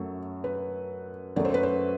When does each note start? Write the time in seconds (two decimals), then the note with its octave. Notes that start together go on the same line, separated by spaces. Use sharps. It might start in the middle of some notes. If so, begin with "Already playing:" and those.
Already playing: F#2 F#3 A3 A4
0.44 B4
1.36 F#2 F#3 A3 D5
1.45 C5
1.54 B4
1.63 C5